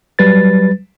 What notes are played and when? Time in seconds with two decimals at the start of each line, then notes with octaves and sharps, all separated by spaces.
0.19 F#3 G3 B4 A6